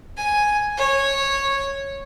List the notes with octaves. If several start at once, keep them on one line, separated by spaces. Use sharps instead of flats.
G#5
C#5